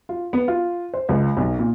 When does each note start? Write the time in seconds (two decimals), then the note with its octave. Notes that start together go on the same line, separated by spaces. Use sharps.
0.09 F4
0.33 B3
0.48 F4
0.94 C5
1.09 C#2
1.37 B1
1.59 A#2